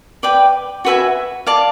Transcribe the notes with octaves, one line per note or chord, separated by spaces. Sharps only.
B4 D5 G5
F#4 B4 E5 G#5
D5 F5 A5